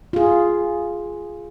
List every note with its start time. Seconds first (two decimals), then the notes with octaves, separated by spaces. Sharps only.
0.13 F4 G#4